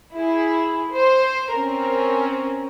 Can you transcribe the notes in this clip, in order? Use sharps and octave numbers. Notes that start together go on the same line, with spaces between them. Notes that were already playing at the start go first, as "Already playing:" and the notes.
E4 G#4
C5
C4 C#4 A#4